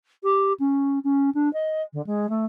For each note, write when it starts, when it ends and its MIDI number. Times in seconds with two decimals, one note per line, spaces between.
0.23 0.53 67
0.59 0.99 61
1.04 1.30 61
1.34 1.51 62
1.53 1.82 75
1.93 2.01 50
2.06 2.29 56
2.29 2.45 57